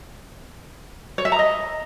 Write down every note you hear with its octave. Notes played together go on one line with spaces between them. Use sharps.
C#5
E5
A#5
D#5